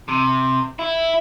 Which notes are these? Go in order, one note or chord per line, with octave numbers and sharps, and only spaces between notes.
C3
E4